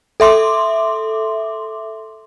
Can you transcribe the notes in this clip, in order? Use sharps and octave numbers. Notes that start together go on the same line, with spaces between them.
A4 E5 C6 D6